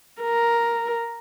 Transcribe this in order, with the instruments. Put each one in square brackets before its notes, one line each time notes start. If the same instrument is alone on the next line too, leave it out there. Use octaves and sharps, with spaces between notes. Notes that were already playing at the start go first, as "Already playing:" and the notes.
[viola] A#4